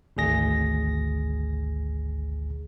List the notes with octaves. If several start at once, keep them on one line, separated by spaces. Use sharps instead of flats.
G#1 D2 G#4 A#6